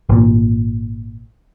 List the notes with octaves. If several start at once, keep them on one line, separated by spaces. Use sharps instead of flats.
G#1 A#2